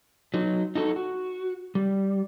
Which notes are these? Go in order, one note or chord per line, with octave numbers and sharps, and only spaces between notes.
F#3 D#4
D#4 F#4 A4
F#4
G3